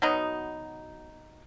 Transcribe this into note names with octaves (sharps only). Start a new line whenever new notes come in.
B2 F#3 B3 D#4